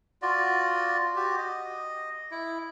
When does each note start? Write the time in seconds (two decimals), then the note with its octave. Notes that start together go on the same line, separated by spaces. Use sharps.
0.22 F4 F#4 D5
1.16 F#4 G4
1.38 D#5
2.31 E4